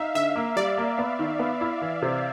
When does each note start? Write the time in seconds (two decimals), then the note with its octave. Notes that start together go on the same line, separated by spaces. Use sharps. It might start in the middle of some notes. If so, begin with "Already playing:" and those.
Already playing: D#4 E5 F5
0.15 D3 E5
0.36 A#3
0.56 G3 D5
0.78 A#3
0.99 B3
1.19 D#3
1.39 B3
1.61 E4
1.82 E3
2.02 C3